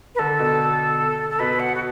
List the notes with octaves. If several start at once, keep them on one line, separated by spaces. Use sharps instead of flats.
B4
D3 A4
B2
A4
B2 B4
F#5
F#4